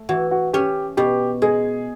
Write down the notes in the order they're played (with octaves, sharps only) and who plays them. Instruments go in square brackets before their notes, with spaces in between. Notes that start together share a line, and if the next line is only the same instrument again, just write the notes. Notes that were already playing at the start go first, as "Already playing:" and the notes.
Already playing: [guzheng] A3
[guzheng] E3 [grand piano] F#4
[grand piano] F#4
[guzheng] C#4 [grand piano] G4
[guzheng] B2 [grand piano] G4
[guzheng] G#3 [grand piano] G#4